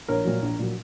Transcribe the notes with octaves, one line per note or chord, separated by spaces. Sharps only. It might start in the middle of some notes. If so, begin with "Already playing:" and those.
A#1 A#4 C#5
A#2 F#3
A#1
A#2 F#3